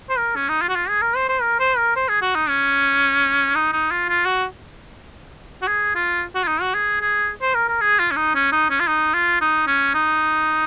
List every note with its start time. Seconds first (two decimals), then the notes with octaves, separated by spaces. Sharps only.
0.09 C5
0.18 A#4
0.36 C#4
0.49 D#4
0.62 F4
0.69 F#4
0.75 F4
0.89 G#4
1.02 A#4
1.16 C5
1.29 C5
1.42 A#4
1.59 C5
1.77 A#4
1.96 C5
2.08 G#4
2.22 F#4
2.35 D#4
2.48 C#4
3.55 D#4
3.72 D#4
3.91 F4
4.09 F4
4.25 F#4
5.62 F#4
5.67 G#4
5.95 F4
6.35 F#4
6.43 F4
6.47 D#4
6.61 F#4
6.74 G#4
7.01 G#4
7.42 C5
7.54 A#4
7.68 A#4
7.81 G#4
7.99 F4
8.11 C#4
8.16 D#4
8.35 C#4
8.52 D#4
8.70 C#4
8.80 F4
8.88 D#4
9.14 F4
9.41 D#4
9.67 C#4
9.94 D#4